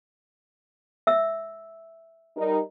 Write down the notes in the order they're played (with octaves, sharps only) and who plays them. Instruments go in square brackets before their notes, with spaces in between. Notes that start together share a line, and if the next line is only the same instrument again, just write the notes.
[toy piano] E5 E6
[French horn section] G3 D#4 A#4